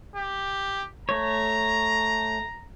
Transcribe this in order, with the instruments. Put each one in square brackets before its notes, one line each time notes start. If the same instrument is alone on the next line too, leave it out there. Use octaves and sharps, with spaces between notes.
[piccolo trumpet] G4
[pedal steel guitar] A3 C#5 [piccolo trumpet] A#5